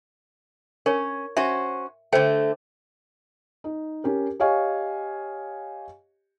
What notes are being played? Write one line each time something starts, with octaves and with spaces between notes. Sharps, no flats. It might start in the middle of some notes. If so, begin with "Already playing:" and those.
C#4 A#4 C#5
C#4 F#4 C5 E5
D3 A3 C5 G5
D#4
C#4 G4 A#4
G4 C#5 D#5 F5 G#5 C#6